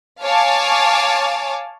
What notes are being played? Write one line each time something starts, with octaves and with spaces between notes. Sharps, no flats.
C#5 F5 G#5 A5 D6